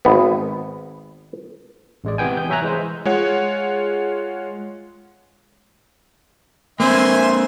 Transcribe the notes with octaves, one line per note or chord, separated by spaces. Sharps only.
G#1 B3
A1 G#3 D5
C3 E3 B3 G5 G#5
G6
F#3 F#4 E5 G#5 A#5 F#6
E3 G#3 C5
G#3 F4 C#5 F#5
A#3 C4 E5 G#5 C6